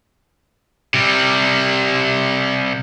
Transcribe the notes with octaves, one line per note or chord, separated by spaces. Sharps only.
C3 G3